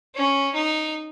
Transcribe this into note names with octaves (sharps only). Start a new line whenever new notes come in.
C#4
D#4